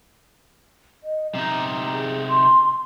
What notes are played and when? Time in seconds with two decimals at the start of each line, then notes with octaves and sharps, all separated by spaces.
1.04 D#5
1.35 C3 D#4 A#5
1.69 A#5
1.92 G#4
2.27 C6